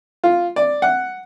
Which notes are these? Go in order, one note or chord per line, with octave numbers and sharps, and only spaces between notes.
F4
D5
F#5